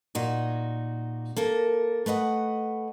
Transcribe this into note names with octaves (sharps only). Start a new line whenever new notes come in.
A#2 D#4 F#4
A#3 A4 A#4
A3 B4 D#5 F#5